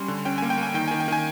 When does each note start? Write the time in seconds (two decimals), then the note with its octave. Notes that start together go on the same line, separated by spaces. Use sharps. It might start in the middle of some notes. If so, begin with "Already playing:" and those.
Already playing: G3 C#4 C6
0.08 D3
0.25 C#4 G5
0.38 A#3 G#5
0.50 G5
0.58 A#3
0.63 G#5
0.74 D#3 G5
0.88 D#3 G#5
1.00 G5
1.08 D#3 G#5